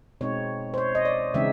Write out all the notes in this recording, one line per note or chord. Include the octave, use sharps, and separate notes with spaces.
B2 G#3 C4 D#4 C#5
C5
C#5
D#5
D5
C#3 E3 G#3 C4 D#4 E5